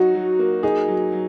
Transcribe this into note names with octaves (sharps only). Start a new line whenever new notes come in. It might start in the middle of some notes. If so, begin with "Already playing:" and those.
Already playing: F#3 D#4 F#4
F#3
A#3
D#4 G#4
F#3
F#3